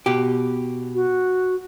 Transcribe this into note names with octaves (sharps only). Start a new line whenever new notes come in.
B2 G4
F#4